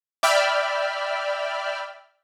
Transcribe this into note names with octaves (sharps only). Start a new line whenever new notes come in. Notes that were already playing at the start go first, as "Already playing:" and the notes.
D5 E5 G5 B5 F6